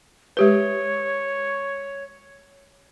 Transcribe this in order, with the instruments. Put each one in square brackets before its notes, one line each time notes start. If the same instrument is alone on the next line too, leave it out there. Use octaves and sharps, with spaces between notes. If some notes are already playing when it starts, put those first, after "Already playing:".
[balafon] G#3 G4 B4 [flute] C#5